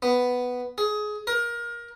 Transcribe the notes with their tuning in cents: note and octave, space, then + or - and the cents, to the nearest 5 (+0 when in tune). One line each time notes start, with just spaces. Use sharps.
B3 +5
G#4 +20
A#4 +25